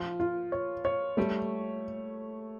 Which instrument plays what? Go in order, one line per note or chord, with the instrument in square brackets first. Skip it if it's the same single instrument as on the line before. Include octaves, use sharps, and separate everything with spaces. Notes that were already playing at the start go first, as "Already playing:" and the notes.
Already playing: [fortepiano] F3 [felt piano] F4
[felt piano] F4
C#5
C#5
[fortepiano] G3 [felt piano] A3